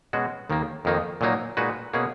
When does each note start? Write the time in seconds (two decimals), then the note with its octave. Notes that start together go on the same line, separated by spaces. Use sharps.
0.13 B2 G#3 C#4 F#4
0.50 D#2 D#3 A#3
0.85 F2 D#3 A#3 D#4
1.21 A#2 F#3 A#3 D#4
1.57 A#2 G#3 D#4 F#4 B4
1.94 B2 A#3 C#4 G#4